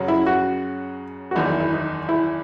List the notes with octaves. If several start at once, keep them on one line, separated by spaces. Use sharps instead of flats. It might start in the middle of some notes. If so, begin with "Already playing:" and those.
Already playing: F#2 C#3 F#3
E4
F#4
F#4
F#1 E2 D#3 E4
E4
E4
D#4
E4